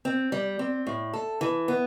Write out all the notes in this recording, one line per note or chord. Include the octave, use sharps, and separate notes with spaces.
C4
G3
C4
A2
A4
E3
B3